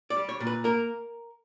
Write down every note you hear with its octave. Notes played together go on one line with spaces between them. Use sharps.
D5
G3
C#5
A#2
B4
A#3 A#4